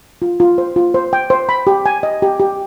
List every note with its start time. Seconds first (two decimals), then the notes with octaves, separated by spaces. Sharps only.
0.22 F4
0.40 F4
0.58 C5
0.76 F4
0.94 C5
1.13 G5
1.30 C5
1.49 B5
1.67 G4
1.86 G#5
2.03 D#5
2.22 G4
2.40 G4